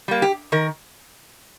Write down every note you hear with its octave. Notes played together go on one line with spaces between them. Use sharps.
G3 A#3
G4
D#3 A#4